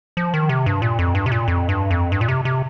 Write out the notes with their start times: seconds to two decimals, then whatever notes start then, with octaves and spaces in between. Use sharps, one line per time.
0.17 F3
0.34 D#3
0.49 C3
0.66 G2
0.82 A#2
0.99 F2
1.15 G2
1.26 C3
1.32 A#2
1.48 F2
1.69 G2
1.91 F2
2.12 G2
2.21 A#2
2.28 C3
2.45 C3